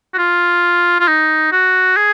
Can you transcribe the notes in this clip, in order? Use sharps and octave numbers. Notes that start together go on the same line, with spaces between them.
F#4
F4
F4
D#4
F#4
G#4